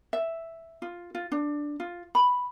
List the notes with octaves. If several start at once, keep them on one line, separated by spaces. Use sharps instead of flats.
E5
F4
F4
D4
F4
B5